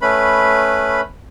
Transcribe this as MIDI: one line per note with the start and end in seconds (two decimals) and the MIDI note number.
0.02 1.01 57
0.02 1.01 61
0.02 1.01 71
0.02 1.01 83